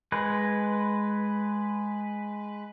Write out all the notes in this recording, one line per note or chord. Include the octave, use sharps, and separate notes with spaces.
G#3 B4